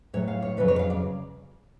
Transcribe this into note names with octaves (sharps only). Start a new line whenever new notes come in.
A2 F#3 C#5
F5
C#5
F2 C#3 F#3 B4
C#5
F5
D5